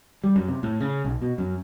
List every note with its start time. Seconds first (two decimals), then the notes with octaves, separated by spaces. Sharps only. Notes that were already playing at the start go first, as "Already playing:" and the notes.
0.24 G3
0.36 F#2
0.48 C3
0.63 A2
0.80 C#3
1.04 B1
1.22 B2
1.38 F#2